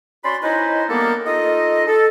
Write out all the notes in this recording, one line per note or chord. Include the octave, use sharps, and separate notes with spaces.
C#4 F#4 D5 B5 C6
C#4 D#4 E4 B4 C5 D#5
G3 A#3 B3 D4 A4 A#4
D#4 F4 A4 D#5
A4